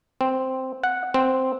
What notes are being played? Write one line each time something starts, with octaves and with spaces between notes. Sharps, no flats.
C4
F#5
C4